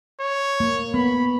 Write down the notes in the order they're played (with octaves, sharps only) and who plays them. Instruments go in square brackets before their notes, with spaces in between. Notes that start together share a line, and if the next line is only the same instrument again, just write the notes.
[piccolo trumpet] C#5
[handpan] A#3
[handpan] B3 [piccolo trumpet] B5